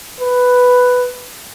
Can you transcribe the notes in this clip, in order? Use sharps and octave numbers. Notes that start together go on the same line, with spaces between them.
B4